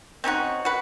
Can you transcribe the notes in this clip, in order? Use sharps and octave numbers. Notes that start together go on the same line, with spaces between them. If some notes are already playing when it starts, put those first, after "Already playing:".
C4 C#4 D#4 F#4
F#4 B4